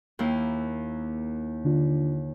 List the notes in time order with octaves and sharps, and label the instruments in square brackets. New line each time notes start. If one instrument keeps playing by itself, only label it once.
[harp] D#2 A#3 E4
[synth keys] D3 D4 F4